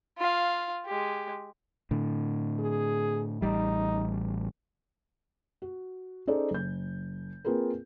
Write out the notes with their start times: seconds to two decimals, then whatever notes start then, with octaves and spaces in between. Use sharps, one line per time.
0.18 F4 F5
0.86 G#3 G4
1.91 A2 D3
2.59 G#4
3.42 A1 G3 D#4
5.62 F#4
6.27 C#4 D#4 G#4 A4 C5 D5
6.51 F#1 G6
7.45 A#3 C4 F4 G#4 A#4 B4